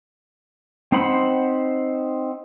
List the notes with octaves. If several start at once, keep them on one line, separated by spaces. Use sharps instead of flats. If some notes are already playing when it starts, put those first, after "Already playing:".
C4 D#4 C5 F#5 B5